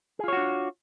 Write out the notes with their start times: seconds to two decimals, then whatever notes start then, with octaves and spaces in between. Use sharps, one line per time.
0.19 G#4
0.24 F4
0.28 C#5
0.33 F#4
0.37 D4